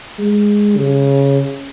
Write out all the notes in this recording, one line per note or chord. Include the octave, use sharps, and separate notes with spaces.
G#3
C#3